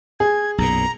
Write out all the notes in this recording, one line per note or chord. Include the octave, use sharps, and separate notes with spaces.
G#4 G#6
B1 F#2 A#2 A#5